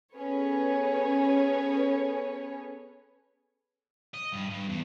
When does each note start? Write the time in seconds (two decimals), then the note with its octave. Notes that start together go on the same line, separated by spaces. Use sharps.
0.14 B3 C#4 G#4 A4 B4 C#5
4.14 D#5
4.33 G2
4.50 G2
4.68 E2